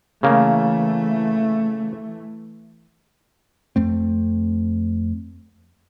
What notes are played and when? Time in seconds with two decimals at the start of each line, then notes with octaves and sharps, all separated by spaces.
0.23 C#3 E3 A3 A#3
3.76 F2 A3 C4